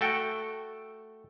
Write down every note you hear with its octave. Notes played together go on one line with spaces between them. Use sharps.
A3 F#4 A4 G5